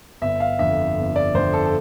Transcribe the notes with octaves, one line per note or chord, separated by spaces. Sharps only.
G1 E5
F5
F2 D3 E5
G1
D5
F2 D3 C5
A4
A4